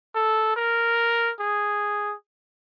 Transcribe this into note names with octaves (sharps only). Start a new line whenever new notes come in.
A4
A#4
G#4